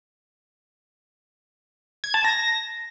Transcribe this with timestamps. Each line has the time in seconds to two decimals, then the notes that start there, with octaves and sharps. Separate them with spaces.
2.04 G#6
2.14 A5
2.25 A#6